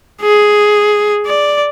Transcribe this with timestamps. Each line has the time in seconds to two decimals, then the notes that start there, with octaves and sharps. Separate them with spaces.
0.21 G#4
1.26 D5